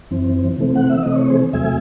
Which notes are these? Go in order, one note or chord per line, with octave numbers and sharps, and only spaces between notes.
F#2 E3 C4
C3 E3 A3 C4
F#5
E5
C3 E3 A3 C4 D#5
C#5
G#4 C5
E2 C3 F#3 A3 E5 G#5